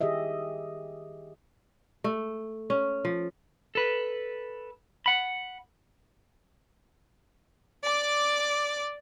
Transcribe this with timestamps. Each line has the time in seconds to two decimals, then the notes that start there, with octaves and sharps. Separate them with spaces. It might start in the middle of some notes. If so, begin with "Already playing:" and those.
0.01 D#3 G4 G#4 D#5 E5
2.04 A3
2.70 C#4
3.05 F3
3.75 A4 B4
5.06 F#5 B5
7.84 D5 D6